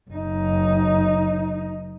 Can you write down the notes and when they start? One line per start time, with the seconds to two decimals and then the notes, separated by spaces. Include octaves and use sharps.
0.11 F#1 D#4